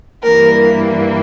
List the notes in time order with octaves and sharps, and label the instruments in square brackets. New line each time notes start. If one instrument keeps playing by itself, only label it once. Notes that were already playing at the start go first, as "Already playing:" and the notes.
[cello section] G2 E3 G3 A#3 [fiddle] A#4